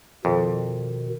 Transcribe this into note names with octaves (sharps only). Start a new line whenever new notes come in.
F2 B2 D#3